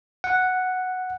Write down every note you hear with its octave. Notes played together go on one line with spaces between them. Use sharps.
F#5